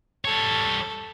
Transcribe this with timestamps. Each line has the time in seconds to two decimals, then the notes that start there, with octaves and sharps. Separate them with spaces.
0.25 G3 A4 C#5